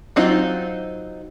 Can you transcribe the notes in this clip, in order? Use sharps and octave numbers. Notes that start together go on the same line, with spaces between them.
F#3 C4 D#4 F4